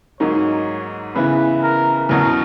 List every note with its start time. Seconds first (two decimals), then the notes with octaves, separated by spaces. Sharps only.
0.20 G#2 F#3 A#3 D#4 C#5
1.15 C#3 E3 B3 E4 B4
1.63 A#4
2.09 E2 B2 F#3 C#4 A#4